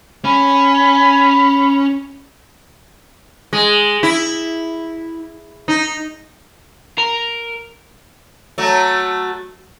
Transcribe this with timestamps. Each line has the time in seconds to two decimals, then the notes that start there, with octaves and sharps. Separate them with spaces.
0.24 C#4 B5
3.53 G#3
4.03 E4
5.68 D#4
6.98 A#4
8.58 F#3 A3